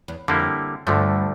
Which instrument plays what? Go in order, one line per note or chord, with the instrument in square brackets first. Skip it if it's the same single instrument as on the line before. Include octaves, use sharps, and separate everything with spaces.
[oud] E2
[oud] F2 [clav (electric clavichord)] D3 G3 A#3 E4
[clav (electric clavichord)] D2 D3 F3 A3 [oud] G2